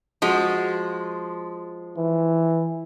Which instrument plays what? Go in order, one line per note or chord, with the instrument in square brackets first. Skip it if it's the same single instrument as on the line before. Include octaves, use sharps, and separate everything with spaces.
[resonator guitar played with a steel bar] F3 G#3 F#4
[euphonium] E3